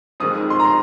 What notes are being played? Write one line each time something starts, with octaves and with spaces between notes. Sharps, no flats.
F2 D#3 G#3 D#6
C6
A#5
C6